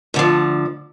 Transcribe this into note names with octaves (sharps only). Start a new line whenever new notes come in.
D2 D3 F3